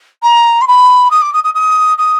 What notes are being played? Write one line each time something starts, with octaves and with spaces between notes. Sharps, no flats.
A#5
C6
B5
D#6
D6
D#6
D#6
D#6
D#6